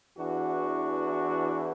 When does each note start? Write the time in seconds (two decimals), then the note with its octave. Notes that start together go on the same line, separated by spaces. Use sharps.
0.18 E2 E3 D4 F#4